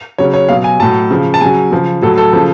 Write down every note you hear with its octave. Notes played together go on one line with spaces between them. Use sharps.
C#3 F#3 C#5
C#5
B2 F#3 F5
G#5
A2 F#3 A5
C#3 F3
A5
C#3 F#3 G#5
C#3 F3
A2 F#3 A4
A4
C#3 F3